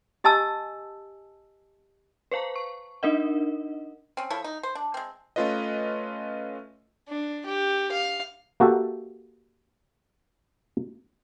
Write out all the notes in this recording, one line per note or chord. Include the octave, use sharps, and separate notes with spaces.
G4 D#5 G#5 A5 E6
B4 C5 F5 A5 A#5
C#6
D4 D#4 A#4 D#5 F#5
C4 C#4
F3 E4 A4 C#5
D#4
C5
D4
G#3 C4
A3 C#4 F4 B4 D#5
D4
G4
F5
A#3 F#4 G4 A4 E5